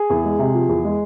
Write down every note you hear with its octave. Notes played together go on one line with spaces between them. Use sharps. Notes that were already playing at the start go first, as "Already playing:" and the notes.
Already playing: G#4
E2
G#3
C3
F3
E2
G#3